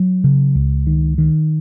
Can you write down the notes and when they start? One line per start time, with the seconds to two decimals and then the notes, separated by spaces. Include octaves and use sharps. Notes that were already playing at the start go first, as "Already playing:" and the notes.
Already playing: F#3
0.24 C#3
0.55 C#2
0.87 D#3
1.18 D#3